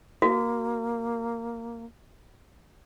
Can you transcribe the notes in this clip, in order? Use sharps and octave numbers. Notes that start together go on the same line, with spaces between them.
A#3 F#4